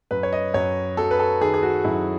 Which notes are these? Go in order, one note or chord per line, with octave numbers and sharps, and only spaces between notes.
F#2 B4
C#5
D#5
F#2 C#5
F#3 A4
B4
A4
D#3 G#4
G#4
F#4
F#2 E4